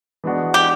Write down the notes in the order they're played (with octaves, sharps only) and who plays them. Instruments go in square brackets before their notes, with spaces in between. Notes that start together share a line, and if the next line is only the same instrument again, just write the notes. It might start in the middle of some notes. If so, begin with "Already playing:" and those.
[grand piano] E3 G#3 B3 D4 F#4
[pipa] G4